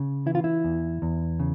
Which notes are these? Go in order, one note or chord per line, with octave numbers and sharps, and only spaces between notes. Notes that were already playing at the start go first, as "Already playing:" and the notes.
Already playing: C#3
E3 E4
F4
E4
E2
E2
C#3